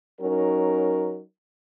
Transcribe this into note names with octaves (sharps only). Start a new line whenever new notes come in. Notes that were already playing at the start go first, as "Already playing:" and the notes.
F#3 C#4 D#4 A#4